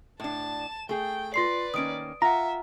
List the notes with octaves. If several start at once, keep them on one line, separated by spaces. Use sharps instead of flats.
A2 D4 A5 E7
A3 G#4 G5
F4 B4 D5 C6 C7
D#3 A#3 C#4 D#6 D7
F4 E5 F#5 A#5